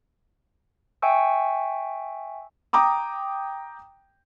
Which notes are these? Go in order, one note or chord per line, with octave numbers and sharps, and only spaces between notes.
E5 G5 G#5 C#6 E6
G5 A#5 D6 D#6